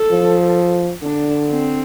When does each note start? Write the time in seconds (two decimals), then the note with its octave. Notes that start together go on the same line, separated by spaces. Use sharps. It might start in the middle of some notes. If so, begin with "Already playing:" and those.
Already playing: A4
0.11 F3
1.02 D3 D4
1.48 C4